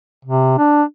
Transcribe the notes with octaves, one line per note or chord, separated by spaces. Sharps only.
C3
D4